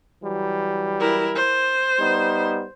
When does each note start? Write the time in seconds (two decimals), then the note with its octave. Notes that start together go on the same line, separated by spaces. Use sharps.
0.23 E3 F#3 G3
1.00 E4 A#4
1.35 C5
1.99 G3 B3 D#4